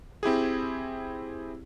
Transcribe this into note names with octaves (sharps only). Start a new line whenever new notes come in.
C4 E4 G4 G#4